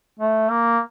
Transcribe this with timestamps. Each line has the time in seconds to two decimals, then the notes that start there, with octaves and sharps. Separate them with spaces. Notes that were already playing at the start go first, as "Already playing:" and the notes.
0.20 A3
0.50 A#3